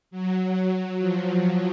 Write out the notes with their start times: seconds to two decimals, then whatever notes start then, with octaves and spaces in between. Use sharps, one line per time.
0.11 F#3
0.99 F3